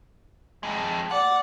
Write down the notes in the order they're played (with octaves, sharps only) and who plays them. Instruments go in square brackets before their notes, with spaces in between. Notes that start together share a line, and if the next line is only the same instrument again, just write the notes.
[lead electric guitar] F2 G#3
[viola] D5 [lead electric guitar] F#5